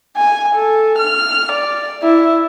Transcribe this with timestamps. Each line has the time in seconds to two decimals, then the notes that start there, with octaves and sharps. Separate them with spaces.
0.17 G#5
0.55 A4
0.99 F6
1.53 D5
2.03 E4